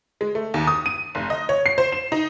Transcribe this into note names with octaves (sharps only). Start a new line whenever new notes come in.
G#3
A3
D#2
D#6
D#7
F1
D#5
C#5
C7
C5
E7
D#4